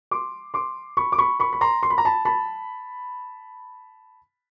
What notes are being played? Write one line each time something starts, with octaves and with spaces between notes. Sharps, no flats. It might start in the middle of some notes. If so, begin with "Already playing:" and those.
C6 D6
C6 D6
B5 C#6
D6
B5 C#6
B5 C#6
B5
A#5 C6
C6
B5
A#5
A5 B5
A5 B5